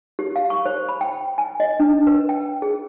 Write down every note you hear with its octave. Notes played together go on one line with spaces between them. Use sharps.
G4
F5
C#6
C5
B5
G5
G#5
D#5
D4
B4
G5
G#4